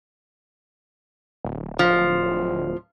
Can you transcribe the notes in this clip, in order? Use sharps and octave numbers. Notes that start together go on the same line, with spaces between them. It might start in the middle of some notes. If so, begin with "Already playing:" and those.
D1
F3